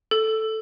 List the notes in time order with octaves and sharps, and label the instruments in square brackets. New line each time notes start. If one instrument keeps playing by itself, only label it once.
[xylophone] A4